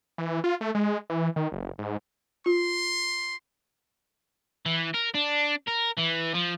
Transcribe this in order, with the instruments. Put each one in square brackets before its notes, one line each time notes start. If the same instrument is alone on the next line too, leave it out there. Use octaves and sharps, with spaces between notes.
[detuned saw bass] E3
F4
A3
G#3
E3
D#3
F#1
G#2
[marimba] F4 [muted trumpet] C6
[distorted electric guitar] E3
A#4
D4
A#4
E3
F3